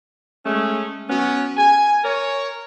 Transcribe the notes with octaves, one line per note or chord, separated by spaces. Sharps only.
G#3 A3 C#4
F#3 B3 C#4
G#5
A#4 C#5